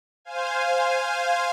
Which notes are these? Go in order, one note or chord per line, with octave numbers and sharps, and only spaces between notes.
C5 F5 G#5